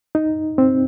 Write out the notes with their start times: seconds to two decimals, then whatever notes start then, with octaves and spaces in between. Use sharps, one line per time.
0.15 D#4
0.58 C4